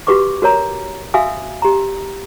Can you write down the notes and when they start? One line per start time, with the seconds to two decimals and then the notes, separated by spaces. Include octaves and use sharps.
0.07 F#4 G4 B4 C#6 D6
0.42 F#4 A#4 C#5 A#5
1.14 F#4 E5 F5 G#5 D#6 E6
1.62 G4 A#5